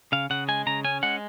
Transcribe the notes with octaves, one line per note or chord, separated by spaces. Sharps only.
C#3 F5
C#3 F#5
G#3 G#5
C#3 A#5
C#4 G#5
G#3 F#5